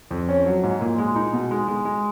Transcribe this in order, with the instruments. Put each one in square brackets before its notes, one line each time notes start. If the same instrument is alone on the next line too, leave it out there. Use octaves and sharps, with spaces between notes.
[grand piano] F2
C#4
F#3
G#2
A#2
G#3
D#4
B2
G#3
G#3
G#3